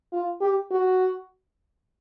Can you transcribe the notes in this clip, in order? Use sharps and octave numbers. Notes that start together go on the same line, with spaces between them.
F4
G4
F#4